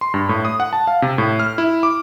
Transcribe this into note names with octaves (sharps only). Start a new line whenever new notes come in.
C6
G2
A2
D#6
F#5
A5
F5
C3
A2
F6
E4
D6